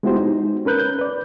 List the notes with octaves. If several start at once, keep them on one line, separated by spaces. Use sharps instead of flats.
G#3 B3 E4 F#4 G4 C5
D#4
C#4 A#4 B4 F#6 G6
G6
B4 D5